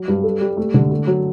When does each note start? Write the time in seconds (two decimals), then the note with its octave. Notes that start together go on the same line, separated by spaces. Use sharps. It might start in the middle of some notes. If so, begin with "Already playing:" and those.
Already playing: F#3
0.08 G2
0.24 A4
0.41 G3
0.57 A3
0.74 D3
0.91 A3
1.07 F#3